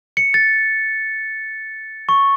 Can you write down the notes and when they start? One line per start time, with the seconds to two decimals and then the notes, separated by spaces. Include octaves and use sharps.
0.17 C#7
0.34 A6
2.09 C#6